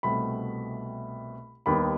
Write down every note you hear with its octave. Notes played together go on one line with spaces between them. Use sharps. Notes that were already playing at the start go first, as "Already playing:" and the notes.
C2 B2 A3 C4 B5
D#2 D#3 G3 B3 D#4 B5